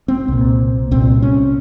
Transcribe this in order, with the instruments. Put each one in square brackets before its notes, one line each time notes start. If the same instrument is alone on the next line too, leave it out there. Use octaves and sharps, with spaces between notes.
[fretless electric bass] C4
C2 A#2
C2 A#2 C4
C#4